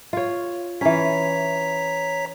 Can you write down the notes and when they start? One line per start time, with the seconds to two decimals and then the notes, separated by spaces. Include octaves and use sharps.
0.13 F4 C#5
0.81 E3 C#4 C#5 A#5 B6